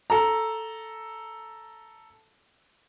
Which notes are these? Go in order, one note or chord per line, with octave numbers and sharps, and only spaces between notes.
A4 A#5